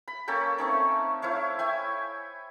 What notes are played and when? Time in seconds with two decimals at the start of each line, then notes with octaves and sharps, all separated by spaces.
0.08 B5
0.28 A#3 C#4 A4 G5
0.58 A3 C4 C#4 D#4
1.22 E4 C5 C#5 F5
1.59 E5 G5 G#5